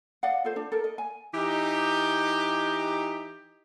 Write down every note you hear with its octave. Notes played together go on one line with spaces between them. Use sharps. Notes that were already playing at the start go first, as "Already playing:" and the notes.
D5 D#5 F5 F#5
F4 A4 C5
D4
A4 A#4
D#5
G#5
E3 D#4 G4